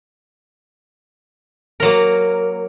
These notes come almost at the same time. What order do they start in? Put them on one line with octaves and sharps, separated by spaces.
A#4 F#3 A#3